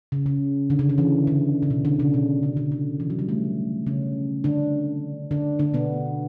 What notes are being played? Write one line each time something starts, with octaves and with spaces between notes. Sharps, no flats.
C#3
C#3
D3
C#3
D3
E3
D3
C#3
B2
D3
C#3
B2
C#3
D3
C#3
E3
F#3
G3
A3
C#3 C#4
D3 D4
D3 D4
D3 D4
B2 B3